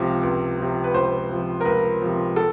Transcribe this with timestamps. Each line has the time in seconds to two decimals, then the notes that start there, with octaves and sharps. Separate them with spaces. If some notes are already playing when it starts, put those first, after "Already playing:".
Already playing: C#2 C3 F3
0.23 C#2
0.58 C3 F3
0.84 B4
0.94 C#2 C5
1.30 C3 F3
1.61 A#4
1.65 C#2 B4
2.01 C3 F3
2.36 A4